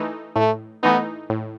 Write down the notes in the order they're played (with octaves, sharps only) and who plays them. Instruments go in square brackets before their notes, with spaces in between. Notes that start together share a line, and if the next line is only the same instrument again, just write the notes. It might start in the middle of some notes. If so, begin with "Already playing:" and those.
Already playing: [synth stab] E3 A3 D#4
[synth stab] A2 [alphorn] A3
[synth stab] E3 A3 D#4 [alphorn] B3
[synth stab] A2